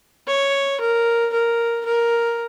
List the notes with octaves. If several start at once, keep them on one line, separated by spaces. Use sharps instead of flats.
C#5
A#4
A#4
A#4